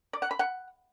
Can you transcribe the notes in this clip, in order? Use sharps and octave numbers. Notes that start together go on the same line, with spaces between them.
D5
F#5
B5
F#5